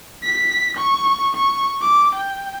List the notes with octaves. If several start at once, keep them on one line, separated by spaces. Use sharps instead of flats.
B6
C#6
C#6
D6
G5